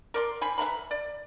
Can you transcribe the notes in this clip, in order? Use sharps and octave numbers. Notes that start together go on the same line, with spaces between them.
A#4 D5 C6
C5 G#5 B5
B4 E5 A#5 B5
D5